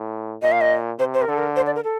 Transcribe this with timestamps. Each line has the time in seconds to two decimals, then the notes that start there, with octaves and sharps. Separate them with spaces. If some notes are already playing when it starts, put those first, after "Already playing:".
Already playing: A2
0.42 A#2 D#5
0.52 F5
0.61 D#5
0.99 C3 C5
1.14 C5
1.22 A#4
1.28 D3 A4
1.38 A#4
1.56 C5
1.66 D5
1.75 A#4
1.84 A4